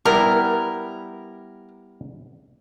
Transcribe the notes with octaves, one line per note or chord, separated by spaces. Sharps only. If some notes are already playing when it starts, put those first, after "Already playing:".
G3 B3 E4 A#4